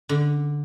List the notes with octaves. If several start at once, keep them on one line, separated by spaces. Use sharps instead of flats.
D3